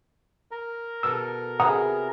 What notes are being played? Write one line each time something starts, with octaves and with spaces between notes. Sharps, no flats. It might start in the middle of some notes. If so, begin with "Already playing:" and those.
A#4
B2 A4 E6
C3 B3 G#4 F#5 A#5 D#6